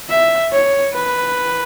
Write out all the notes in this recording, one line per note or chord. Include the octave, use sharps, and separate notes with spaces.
E5
C#5
B4